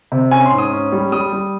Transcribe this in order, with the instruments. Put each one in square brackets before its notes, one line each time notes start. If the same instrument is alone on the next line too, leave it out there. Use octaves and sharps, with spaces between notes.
[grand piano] C3
C#4 G#5
C6
G#2
D#6
C#4
G3
G3 D#6
G3